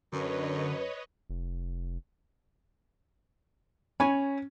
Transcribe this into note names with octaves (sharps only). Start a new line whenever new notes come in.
F#2 D3 B4 C#5 D#5
F1
C#4 C#5 G#5 B5